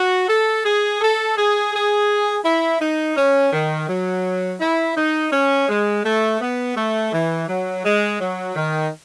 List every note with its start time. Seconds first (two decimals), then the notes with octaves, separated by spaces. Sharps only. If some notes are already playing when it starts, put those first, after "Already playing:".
Already playing: F#4
0.29 A4
0.65 G#4
1.01 A4
1.37 G#4
1.73 G#4
2.45 E4
2.81 D#4
3.17 C#4
3.53 D#3
3.89 F#3
4.60 E4
4.97 D#4
5.32 C#4
5.69 G#3
6.05 A3
6.41 B3
6.77 A3
7.12 E3
7.49 F#3
7.85 G#3
8.20 F#3
8.56 D#3